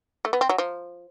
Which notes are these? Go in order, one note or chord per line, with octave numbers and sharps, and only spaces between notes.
A3
B3
C4
F#3
F3